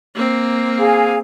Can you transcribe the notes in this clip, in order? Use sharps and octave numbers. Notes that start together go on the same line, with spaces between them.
A#3 C4
G#4 F5 G#5